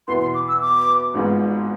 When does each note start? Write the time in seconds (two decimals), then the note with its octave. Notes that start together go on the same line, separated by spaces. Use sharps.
0.07 E2 B2 B3 E4 C6
0.22 C6
0.34 D6
0.48 E6
0.61 D6
1.14 G#1 G#2 G#3 B3 F4